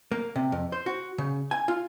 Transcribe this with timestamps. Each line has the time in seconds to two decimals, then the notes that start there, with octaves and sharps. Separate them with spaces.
0.12 A#3
0.36 C3
0.52 F2
0.72 C5
0.86 F#4
1.18 C#3
1.51 G#5
1.68 F4